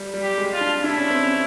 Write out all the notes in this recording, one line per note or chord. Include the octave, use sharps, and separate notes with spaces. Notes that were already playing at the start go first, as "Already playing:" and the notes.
Already playing: G3
G3
G4
G#3
F4
D4
D4 E4
C#4
C4
C#4